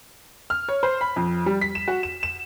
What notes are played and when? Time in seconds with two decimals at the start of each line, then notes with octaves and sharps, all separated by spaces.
0.50 F6
0.69 C#5
0.83 C5
1.01 B5
1.16 F2
1.46 G3
1.61 B6
1.75 E7
1.88 F#4
2.03 E7
2.23 E7